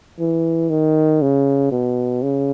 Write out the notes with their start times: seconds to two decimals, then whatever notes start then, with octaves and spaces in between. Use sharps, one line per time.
0.19 E3
0.70 D#3
1.22 C#3
1.71 B2
2.22 C#3